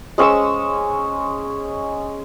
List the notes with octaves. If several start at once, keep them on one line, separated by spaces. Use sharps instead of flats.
G#3 C#4 C#6 E6